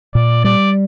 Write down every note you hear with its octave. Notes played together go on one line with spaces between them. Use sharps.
A#2 D5
G3 D5